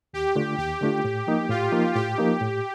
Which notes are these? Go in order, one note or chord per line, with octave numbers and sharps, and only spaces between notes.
D#2 G4
D3 A3 D4 F4
D#2 G4
D3 A3 D4 F4
A2
F3 A#3 D#4
A2 F4
F3 A#3 D#4
A2 G4
F3 A#3 D#4
A2